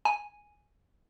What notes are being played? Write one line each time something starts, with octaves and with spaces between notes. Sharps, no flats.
G#5